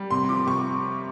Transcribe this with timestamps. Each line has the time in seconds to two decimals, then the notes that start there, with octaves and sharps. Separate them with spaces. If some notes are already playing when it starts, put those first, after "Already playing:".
Already playing: G3
0.11 C3 C6
0.29 F3 D6
0.47 C3 C#6